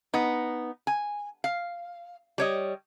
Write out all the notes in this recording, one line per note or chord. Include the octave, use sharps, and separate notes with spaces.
B3 D#4
G#5
F5
G3 C#5 D#5